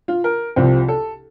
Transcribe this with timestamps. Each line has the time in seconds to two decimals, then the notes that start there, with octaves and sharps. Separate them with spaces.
0.08 F4
0.24 A#4
0.56 C2 C3 F3 C4
0.88 A4